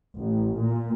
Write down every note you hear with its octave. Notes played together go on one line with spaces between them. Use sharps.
A1
A#2